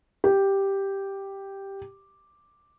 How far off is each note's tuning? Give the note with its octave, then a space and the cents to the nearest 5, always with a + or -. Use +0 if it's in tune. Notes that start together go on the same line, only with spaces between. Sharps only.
G4 +0